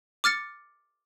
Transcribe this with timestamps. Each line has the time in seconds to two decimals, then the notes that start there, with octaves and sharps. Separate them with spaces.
0.24 D6 F6 A6 C#7